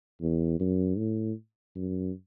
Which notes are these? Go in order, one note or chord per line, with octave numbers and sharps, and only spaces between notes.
E2
F#2
A2
F#2